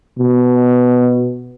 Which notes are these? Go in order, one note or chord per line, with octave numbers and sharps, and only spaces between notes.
B2